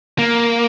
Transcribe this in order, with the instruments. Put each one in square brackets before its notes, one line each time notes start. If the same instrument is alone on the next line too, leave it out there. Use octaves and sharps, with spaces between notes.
[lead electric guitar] A#3